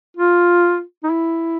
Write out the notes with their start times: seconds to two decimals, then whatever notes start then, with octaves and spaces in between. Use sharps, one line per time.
0.17 F4
1.03 D#4
1.10 E4